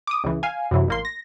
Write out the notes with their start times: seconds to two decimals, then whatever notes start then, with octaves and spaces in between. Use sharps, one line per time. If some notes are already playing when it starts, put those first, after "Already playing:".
0.07 D6 D#6
0.24 C#2 E3
0.43 F5 G#5
0.71 F#2 C3 E3 F#3
0.88 A1 A#3 C6
1.05 A#6